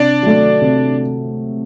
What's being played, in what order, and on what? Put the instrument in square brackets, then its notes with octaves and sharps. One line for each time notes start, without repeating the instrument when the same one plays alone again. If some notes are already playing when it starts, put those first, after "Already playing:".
Already playing: [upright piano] C3 [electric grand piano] D4 D5
[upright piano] F#3 A3
C3